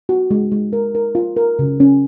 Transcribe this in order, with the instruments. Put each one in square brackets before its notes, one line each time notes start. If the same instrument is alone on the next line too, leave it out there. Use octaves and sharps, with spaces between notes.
[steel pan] F#4
G#3
G#3
A#4
A#4
F4
A#4
C#3
C#4